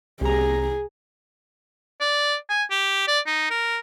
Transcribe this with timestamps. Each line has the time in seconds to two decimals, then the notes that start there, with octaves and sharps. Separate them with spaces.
0.21 C2 G#4 A#5
2.01 D5
2.49 G#5
2.71 G4
3.08 D5
3.26 D#4
3.50 A#4